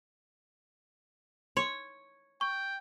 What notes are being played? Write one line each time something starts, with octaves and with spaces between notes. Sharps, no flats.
C#5 C6
G5 C#6